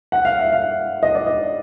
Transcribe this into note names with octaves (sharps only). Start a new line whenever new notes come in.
F#5
F5
E5
F5
D#5
D5
D#5